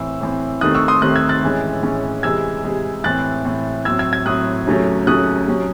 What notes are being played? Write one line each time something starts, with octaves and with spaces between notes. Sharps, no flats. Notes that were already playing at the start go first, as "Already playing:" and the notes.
Already playing: A2 E3 C4 E6
A2 E3 C4
D#2 D#3 A3 C4 D#6 F#6
C#6 E6
C6 D#6
D#2 D#3 A3 C4 D#6 F#6
E6 G#6
F#6 A6
A2 E3 G#3 C#4
A2 E3 G#3 C#4
C3 E3 G#3 E6 G#6
C3 E3 G#3
A2 E3 C4 F#6 A6
A2 E3 C4
A2 F#3 C4 E6 G#6
E6 G#6
E6 G#6
A2 F#3 C4 D#6 F#6
D#2 C#3 F#3 A3 C#4
D#2 C#3 F#3 A3 C#4 D#6 F#6
C3 F#3 C#4